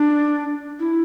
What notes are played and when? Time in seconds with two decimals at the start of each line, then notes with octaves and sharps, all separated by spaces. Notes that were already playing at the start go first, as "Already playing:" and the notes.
Already playing: D4
0.80 E4